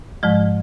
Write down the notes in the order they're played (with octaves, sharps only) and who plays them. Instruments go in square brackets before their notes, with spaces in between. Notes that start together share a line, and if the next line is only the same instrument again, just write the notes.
[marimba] G#2 F3 G#3